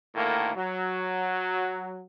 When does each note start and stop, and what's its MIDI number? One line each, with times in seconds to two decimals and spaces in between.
0.15 0.51 38
0.15 0.51 45
0.15 0.51 51
0.15 0.51 58
0.56 2.03 54